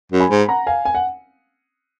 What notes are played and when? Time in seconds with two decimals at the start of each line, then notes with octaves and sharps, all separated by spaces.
0.12 F#2
0.20 G#5 B5
0.30 G#2
0.48 F#5 A#5
0.67 F5 G#5
0.85 G#5
0.95 F#5